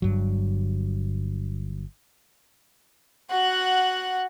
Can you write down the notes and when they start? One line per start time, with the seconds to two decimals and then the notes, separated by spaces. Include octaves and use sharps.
0.02 G1 G2 F#3
3.31 F#4 F#5